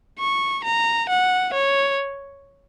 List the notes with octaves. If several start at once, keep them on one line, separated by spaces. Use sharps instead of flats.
C#6
A#5
F#5
C#5